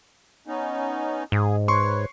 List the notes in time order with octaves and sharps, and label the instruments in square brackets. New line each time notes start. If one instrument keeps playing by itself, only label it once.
[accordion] B3 C#4 D#4
[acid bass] G#2 [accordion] G#4
[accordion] B4 C#5 [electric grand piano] C6 C#6